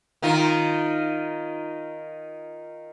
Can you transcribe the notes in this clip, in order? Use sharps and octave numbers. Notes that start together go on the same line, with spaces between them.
D#3 D#4 F4